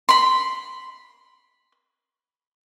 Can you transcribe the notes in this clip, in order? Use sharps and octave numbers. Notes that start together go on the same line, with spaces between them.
B5 C6